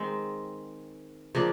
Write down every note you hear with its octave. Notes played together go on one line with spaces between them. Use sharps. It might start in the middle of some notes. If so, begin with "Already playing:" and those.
Already playing: D#3 G#3 C4
C#3 F3 A#3 D4